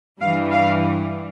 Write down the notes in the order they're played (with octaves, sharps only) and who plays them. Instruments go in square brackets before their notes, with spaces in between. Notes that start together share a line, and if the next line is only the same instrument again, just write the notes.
[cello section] G2 E3 G3 F5
F5